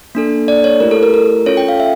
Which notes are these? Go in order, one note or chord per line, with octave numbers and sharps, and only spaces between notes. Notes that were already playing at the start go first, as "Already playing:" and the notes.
A#3 D4 A4
D5
C#5
A3 E4 G4 A#4
A4
A#4
A#4
C#4 F4 A4 C#5
G5
F5
E5